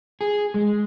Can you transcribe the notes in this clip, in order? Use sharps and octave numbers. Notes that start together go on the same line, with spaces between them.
G#4
G#3